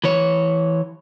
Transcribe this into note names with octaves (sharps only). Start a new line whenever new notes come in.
E3 C#5